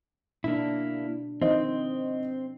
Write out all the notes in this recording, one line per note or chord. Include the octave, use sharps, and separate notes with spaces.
B2 A#3 D4 E4
D#3 F3 C4 C5 D#5